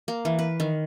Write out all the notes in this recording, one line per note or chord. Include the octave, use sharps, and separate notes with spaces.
A#3
E3
B4
D#3